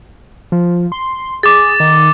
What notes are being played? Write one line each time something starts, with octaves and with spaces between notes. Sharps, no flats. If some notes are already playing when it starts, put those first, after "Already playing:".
F3
C6
G#4 D6 A6
D#3